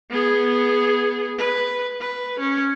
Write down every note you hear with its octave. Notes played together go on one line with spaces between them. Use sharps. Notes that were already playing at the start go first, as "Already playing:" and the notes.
B3 G#4
B4
B4
C#4